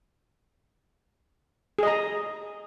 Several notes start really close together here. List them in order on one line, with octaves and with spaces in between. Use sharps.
G#4 D#5 A#5